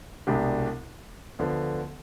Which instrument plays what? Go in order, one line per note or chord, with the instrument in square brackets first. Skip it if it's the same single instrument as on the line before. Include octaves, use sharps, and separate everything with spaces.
[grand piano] C2 B2 G#3 D4 G4
D2 D3 F3 B3